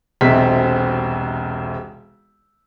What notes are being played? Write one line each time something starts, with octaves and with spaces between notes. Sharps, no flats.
E1 B1 C3 C4 E5 B6